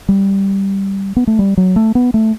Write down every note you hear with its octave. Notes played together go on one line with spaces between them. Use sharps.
G3
B3
A3
G3
F#3
A3
B3
A3